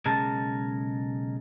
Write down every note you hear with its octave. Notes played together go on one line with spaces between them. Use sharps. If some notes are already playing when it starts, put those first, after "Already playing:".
B1 C#3 G#3 A#4 A5